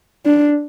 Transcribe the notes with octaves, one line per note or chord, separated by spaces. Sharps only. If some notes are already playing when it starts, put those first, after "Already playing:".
D4